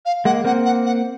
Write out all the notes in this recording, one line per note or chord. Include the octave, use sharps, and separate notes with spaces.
F5
G#3 A#3 F#5
A#3 C4 F#5
F#5
F#5